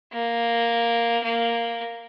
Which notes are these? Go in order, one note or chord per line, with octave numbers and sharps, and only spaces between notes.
A#3
A#3